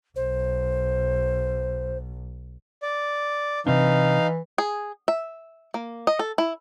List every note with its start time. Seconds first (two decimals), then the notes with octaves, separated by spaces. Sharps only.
0.16 B1 C5
2.83 D5
3.66 C3 E3 C4 D4 D#4 F5
4.58 G#4
5.08 E5
5.74 A#3
6.07 D#5
6.19 A4
6.38 E4